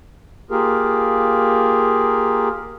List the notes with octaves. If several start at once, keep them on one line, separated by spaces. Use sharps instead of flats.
A#3 F4 G4 G#4 A#4